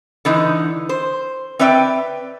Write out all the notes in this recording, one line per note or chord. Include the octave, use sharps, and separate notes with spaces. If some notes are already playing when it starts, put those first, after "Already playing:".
D3 E3 D#4
C5
C4 B4 D5 E5 G5